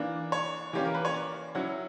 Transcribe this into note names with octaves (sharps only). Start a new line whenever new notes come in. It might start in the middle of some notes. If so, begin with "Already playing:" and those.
Already playing: E3 A#3 D4
C#5
E3 A#3 C#4 G4
A#4
B4
C#5
D5
F#3 C#4 E4 F#5